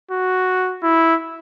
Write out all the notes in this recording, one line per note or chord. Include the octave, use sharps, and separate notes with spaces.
F#4
E4